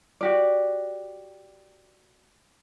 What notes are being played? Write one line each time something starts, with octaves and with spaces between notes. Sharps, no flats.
F#4 G4 D5